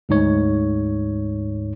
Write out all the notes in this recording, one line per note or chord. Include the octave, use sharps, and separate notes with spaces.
D2 G#2 C#5